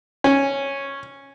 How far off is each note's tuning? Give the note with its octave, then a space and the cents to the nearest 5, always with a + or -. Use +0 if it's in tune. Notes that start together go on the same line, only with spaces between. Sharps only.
C#4 -5